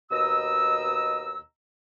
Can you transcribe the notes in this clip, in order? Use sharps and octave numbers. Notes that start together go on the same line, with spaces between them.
D#2 B2 D#5 A#5 E6